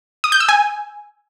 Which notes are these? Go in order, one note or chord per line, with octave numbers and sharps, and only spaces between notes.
D#6
G6
E6
G#5